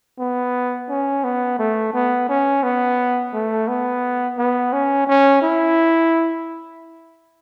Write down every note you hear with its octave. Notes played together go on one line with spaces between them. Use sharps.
B3
C#4
B3
A3
B3
C#4
B3
A3
B3
B3
C#4
C#4
E4